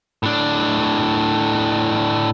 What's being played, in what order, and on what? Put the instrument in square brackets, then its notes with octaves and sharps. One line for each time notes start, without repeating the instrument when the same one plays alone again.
[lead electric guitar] A2 D4